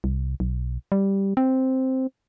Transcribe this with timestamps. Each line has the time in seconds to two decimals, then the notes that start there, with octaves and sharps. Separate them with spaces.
0.04 C2
0.40 B1
0.92 G3
1.37 C4